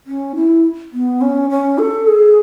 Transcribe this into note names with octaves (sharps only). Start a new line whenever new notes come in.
C#4
E4
B3
C#4
C#4
A4
G#4